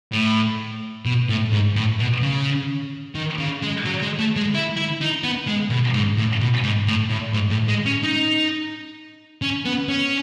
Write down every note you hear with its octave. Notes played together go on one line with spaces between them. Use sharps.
A2
B2
A2
G#2
A2
B2
C#3
D#3
C#3
G#3
F#3
G#3
A3
G#3
E4
E4
D#4
B3
G#3
B2
G#2
A2
B2
G#2
A2
A2
G#2
A2
G#3
C#4
D#4
C#4
B3
C#4